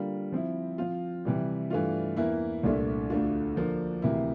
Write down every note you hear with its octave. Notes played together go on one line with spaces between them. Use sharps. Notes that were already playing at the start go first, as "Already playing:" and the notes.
Already playing: D3 G3 A#3 F4
F3 C4 E4
F3 C4 F4
C3 E3 G3
G2 E3 A3 D4 F4
E2 E3 A#3 E4
C2 A#2 A3 D4
D2 D3 A3 D4 F4
D3 F3 A#3 D4
D2 C3 E3 A#3 E4